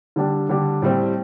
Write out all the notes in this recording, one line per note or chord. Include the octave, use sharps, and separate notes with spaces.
D3 G3 D4 G4
D3 G3 D4 G4
A2 G3 C4